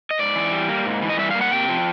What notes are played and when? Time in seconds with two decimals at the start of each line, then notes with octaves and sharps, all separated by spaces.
0.11 D#5
0.19 G#2 D5
0.35 E3
0.52 G3
0.68 A#3
0.85 G#2
1.02 E3
1.10 D#5
1.18 G3 E5
1.31 A#3 F5
1.41 F#5
1.51 C3 G5
1.68 F3